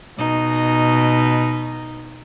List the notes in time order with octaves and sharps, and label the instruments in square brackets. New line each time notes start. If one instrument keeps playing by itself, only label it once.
[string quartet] B2 D#4